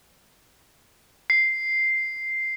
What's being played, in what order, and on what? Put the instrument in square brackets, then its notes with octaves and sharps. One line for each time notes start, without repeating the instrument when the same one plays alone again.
[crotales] C7